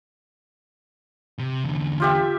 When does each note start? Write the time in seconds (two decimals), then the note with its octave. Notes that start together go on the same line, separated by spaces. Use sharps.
1.39 C3
1.64 E2 D3
2.00 F4 G4 E5